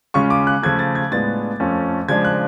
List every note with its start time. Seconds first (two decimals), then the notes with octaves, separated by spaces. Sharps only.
0.14 C#3 G#3 C#4 F4 C#6
0.30 D6
0.47 F#6
0.63 C#3 F3 A3 G#6
0.79 A6
0.95 G#6
1.12 A2 G#3 B3 D4 F4 A6
1.60 F2 F3 A3 C#4 F4
2.08 C#3 F3 G#3 D4 G#6
2.25 F#6